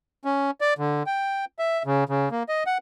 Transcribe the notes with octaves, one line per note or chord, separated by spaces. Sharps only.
C#4
D5
D3
G5
E5
C#3
C#3
A#3
D#5
F#5